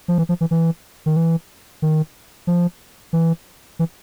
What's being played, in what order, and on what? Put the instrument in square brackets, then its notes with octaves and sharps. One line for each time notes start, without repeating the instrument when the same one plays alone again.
[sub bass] F3
E3
F3
E3
E3
D#3
E3
D#3
F3
E3
E3